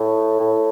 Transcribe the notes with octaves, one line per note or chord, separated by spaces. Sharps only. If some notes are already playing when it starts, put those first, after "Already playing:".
Already playing: A2
A2